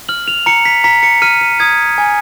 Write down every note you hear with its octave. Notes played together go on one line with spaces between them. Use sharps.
F6 F#7
F7
A#5 C#7
B6
A#5 B6
C#7
F6 D#7
D#7
D#6 G#6
G#5